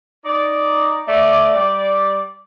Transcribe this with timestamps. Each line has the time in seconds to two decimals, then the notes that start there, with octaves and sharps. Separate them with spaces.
0.25 D#4 D5
1.07 A3 D5
1.54 G3 D5